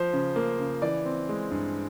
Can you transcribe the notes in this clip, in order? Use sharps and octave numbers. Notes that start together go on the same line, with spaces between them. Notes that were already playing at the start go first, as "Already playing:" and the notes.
Already playing: F3 C5
C#3
A#3
C#3
E3 D5
C4
G#3
G2